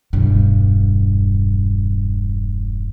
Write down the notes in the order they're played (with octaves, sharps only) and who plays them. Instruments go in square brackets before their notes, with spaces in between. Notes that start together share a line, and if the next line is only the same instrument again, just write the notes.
[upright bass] E1 G2